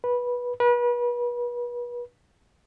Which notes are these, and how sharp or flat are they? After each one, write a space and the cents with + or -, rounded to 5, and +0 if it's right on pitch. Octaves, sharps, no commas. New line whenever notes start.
B4 -15
B4 -35